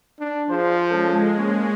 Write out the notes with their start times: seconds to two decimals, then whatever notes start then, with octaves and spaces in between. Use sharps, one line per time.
0.19 D4
0.49 F3 G#4 C5
0.89 G#3 C#4 F4 A4
1.36 A#3 C#4